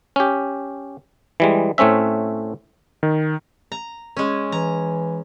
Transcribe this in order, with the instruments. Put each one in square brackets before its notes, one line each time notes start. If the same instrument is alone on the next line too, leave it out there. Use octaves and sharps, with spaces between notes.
[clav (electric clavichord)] C#4 G4
E3 G3 G#3
A2 A3 C4 C#4 E5
[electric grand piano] D#3
[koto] A#5
G#3 C#4
[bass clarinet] E3 [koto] A#5